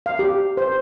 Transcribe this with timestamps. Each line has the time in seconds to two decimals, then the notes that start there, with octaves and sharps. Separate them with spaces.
0.06 F5
0.19 G4
0.57 C5